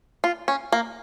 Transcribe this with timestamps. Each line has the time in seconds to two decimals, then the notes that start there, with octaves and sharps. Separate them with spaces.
0.24 F4
0.48 C#4
0.72 A#3